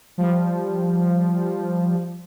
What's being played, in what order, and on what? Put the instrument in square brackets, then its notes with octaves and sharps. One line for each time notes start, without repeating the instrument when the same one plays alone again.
[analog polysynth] F3 G3